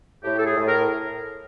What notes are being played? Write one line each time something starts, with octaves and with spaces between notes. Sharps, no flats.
A2 G4
A4
G#4
A2
A#4